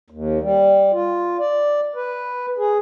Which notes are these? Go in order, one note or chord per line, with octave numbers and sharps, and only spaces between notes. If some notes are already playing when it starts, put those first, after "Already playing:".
D#2
G3
F4
D5
B4
G#4